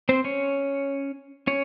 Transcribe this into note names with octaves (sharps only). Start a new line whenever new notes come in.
C4 C5
C#4 C#5
C#4 C#5